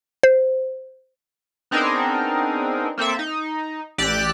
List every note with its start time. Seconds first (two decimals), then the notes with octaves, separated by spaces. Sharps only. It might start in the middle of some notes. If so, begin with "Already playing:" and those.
0.23 C5
1.71 B3 C4 D4 D#4 G#4 A#4
2.98 A#3 C4 A4 E5
3.19 D#4
3.98 A1 G4 D5 E6 F#6